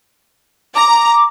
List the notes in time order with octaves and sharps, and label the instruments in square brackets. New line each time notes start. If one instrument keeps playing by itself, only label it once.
[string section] A#5 [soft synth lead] D6